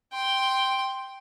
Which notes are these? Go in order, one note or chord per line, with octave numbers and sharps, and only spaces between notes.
G5 C6